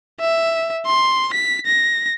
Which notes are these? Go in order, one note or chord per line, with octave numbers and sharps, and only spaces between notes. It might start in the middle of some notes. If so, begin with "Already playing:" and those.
E5
C6
B6
A#6